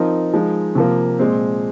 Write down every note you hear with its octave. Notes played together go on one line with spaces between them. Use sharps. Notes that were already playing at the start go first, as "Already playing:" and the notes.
Already playing: F3 C4 D#4 A#4
F3 G#3 D#4
C3 F3 A#3
A#2 G#3 C4